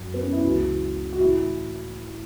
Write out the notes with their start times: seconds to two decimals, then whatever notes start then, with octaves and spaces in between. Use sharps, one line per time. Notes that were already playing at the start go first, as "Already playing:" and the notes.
Already playing: F#2 F#3
0.14 B3
0.23 C#4
0.33 E4
0.43 C#2 C#3 E3 F#4
1.12 F#4
1.20 A2 E3 E4